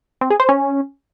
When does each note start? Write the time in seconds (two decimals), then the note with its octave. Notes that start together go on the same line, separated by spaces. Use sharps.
0.21 C4
0.30 G#4
0.40 C5
0.49 C#4